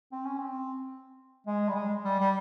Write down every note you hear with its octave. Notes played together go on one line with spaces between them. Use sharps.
C4
C#4
C4
G#3
G3
G#3
G3
G3